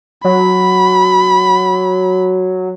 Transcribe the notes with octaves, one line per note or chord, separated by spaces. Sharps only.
F#3 B5